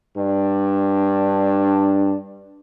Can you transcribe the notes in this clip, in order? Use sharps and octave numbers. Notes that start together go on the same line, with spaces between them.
G2 D4